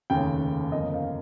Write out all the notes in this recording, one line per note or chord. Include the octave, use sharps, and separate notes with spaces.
F1 D#2 C#3 G5
G1 F2 C#3 F3 A#3 D#5
F5